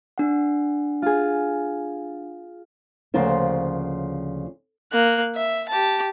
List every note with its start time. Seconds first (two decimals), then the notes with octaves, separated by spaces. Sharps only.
0.18 D4 F#5
1.02 F4 G#4
3.14 D2 C#3 F3 A#3 F4 C5
4.92 A#3 F#6
5.36 E5
5.69 G4 A5